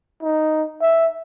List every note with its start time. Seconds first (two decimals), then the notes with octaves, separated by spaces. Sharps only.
0.23 D#4
0.82 E5